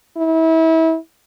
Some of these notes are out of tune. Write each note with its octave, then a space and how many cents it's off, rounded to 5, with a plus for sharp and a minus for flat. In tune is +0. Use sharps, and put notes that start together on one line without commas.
E4 -30